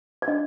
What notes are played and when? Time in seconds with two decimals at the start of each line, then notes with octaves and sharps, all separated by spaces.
0.22 D5
0.28 D4 D#5